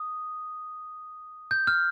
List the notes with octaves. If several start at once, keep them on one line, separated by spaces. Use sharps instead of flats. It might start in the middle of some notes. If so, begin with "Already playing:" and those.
Already playing: D#6
G6
F6